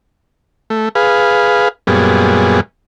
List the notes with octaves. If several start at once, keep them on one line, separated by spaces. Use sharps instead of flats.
A3
G#4 B4 F5
F#2 A#2 G3 B3 G#4